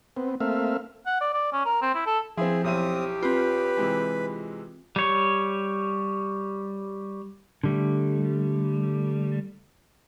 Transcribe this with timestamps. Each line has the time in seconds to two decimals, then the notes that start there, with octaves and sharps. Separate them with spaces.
0.17 B3 C4
0.40 A3 A#3 C4 E5 F5
1.06 F#5
1.21 D5
1.33 D5
1.52 C#4
1.65 A#4
1.82 C4
1.95 E4
2.06 A4
2.37 F3 C4 E4 G#4
2.64 B1 C4 E4 G4 D#6 D#7
3.23 C4 F4 B4
3.77 C3 E3 G#3
4.96 G3 C#5
7.64 D3 G3 A3